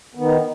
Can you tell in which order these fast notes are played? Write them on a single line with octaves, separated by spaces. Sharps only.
B3 D#3 D#4